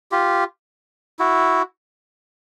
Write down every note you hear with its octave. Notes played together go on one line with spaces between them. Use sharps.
F4 G4
E4 F#4